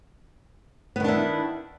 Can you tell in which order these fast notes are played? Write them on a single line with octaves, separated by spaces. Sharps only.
B3 D#3 D4 E4